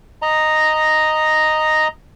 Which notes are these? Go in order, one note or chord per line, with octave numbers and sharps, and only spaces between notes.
D#5 A#5